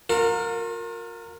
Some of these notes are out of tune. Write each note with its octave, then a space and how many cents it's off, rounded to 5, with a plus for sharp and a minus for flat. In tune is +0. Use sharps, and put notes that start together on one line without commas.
F4 +40 A#4 -15